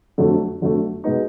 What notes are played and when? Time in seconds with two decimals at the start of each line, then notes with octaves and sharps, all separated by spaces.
0.18 F2 D3 F#3 A3
0.61 F2 D3 F#3 A3
1.04 B2 G#3 B3 D#4